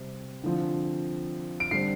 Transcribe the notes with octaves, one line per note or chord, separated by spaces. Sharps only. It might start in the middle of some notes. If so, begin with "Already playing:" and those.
Already playing: C3 G3 C4
D3 F3 C4
D7
D3 G3 C4 C7